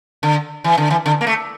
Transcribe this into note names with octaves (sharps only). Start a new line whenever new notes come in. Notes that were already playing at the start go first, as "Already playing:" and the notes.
D3
E3
D3
E3
D3
A#3
A3